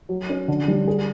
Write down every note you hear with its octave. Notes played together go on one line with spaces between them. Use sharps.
F#3
C#4
D3
G3
G#4